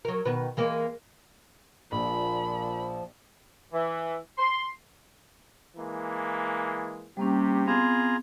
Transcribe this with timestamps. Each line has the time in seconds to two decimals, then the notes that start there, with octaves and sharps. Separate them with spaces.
0.05 F#3 A#4
0.25 B2 D#3 B4
0.57 E3 G#3 A#3
1.92 A#1 A#2 F3 B5
3.73 E3
4.38 C6
5.77 E3 G#3 A#3
7.17 C3 G3 A#3 C#4 G4
7.67 B3 C4 F4 G#4 A#5